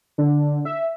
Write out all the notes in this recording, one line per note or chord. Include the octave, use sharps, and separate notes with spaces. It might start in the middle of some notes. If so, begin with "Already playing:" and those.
D3
E5